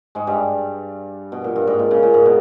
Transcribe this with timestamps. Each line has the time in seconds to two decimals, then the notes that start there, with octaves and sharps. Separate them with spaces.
0.15 G#2 G#3
0.27 G2 G3
1.32 B2
1.44 A#2
1.56 G2
1.67 G#2
1.79 A#2
1.91 C#3
2.03 A#2
2.14 G#2
2.26 B2